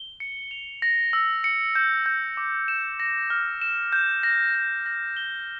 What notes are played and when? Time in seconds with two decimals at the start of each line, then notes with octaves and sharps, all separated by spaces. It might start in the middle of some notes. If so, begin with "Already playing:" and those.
Already playing: G7
0.20 C#7
0.51 F7
0.82 A#6
1.13 E6
1.44 C#7
1.75 G6
2.06 G6
2.37 D6
2.68 E7
3.00 A#6
3.30 F6
3.61 E7
3.92 G6
4.23 A#6
4.55 A#6
4.86 A#6
5.17 G7